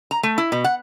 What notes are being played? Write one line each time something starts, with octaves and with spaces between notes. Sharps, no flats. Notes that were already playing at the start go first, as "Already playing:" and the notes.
A#5
A3
E4
B2
F#5